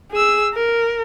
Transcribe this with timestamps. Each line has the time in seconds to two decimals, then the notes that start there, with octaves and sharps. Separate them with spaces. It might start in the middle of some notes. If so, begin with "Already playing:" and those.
0.11 G#4 E6
0.54 A#4